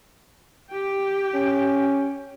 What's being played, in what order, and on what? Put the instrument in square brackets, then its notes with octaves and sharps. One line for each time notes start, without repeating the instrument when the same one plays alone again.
[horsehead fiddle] G4 G5
[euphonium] C#4